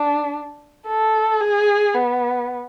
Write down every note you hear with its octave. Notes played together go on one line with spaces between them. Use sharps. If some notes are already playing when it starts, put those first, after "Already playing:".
Already playing: D4
A4
G#4
B3